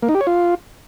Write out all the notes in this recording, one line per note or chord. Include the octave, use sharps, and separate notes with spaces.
A#3
D#4
G4
C#5
F4